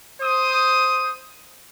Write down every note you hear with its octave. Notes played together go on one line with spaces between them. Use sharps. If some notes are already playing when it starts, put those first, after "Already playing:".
C5 D#6